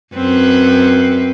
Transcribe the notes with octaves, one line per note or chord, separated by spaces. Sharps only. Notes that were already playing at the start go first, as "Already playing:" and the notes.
F#2 C4 B4